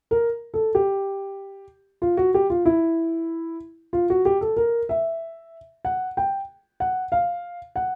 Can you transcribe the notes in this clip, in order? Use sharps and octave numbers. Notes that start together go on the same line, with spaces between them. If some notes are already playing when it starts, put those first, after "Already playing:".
A#4
A4
G4
F4
F#4
G4
F4
E4
F4
F#4
G4
A4
A#4
E5
F#5
G5
F#5
F5
F#5